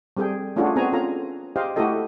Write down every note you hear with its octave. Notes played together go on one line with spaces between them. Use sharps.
G3 C4 G#4 A4 G5
A3 C#4 D4 F4 F#4 G#4
B3 C4 F#4 G#4 G#5 A#5
C#4 F4 A4 A#5
G4 G#4 C5 D#5 F5 G5
A3 E4 F#4 G4 A4 D#5